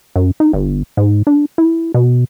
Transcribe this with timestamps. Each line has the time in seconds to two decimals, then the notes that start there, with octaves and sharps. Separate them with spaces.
0.16 F#2
0.40 D#4
0.53 G1
0.97 G#2
1.27 D4
1.58 E4
1.94 B2